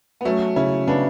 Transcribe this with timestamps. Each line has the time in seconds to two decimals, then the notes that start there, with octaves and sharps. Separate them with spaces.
0.21 B3
0.25 F#3 A3 C#4
0.56 C#3 C#4 E4
0.87 C#3 B3 D4